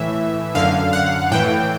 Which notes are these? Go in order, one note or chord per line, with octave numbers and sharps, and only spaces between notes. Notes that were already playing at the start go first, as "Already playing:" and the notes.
Already playing: A2 E3 E5
F#2 D3 F5
F#5
A2 E3 G5